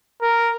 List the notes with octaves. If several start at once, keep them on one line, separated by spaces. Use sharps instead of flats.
A#4